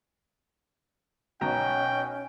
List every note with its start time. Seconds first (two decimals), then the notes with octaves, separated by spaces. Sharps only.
1.41 B1 B2 C#4 G5 A#5